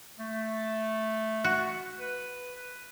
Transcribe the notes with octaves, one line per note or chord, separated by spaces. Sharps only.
A3
F#4
B4